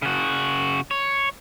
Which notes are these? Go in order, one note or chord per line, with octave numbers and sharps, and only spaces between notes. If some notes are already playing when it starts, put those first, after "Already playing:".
C#3 F#4
C#5